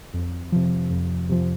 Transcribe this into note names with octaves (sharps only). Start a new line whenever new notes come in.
F2
C3 F3
F2
C3 F3